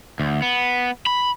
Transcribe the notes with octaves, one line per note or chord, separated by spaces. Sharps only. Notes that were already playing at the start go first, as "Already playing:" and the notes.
D2
B3
B5